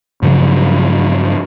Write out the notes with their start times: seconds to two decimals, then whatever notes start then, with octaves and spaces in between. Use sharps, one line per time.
0.22 G2 C#3 F3 F#3